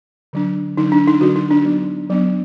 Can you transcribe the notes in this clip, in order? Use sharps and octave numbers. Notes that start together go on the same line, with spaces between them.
D3 F#3 D4
D3 F#3 D4 D#4
D4
D#4
D3 F#3 D4 F#4
D#4
D4
F#3 B3 D4
F#3 B3 D4